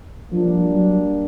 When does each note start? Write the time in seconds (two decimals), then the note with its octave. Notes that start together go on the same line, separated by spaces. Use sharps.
0.31 F3 G3 A#3 D4
0.69 F#3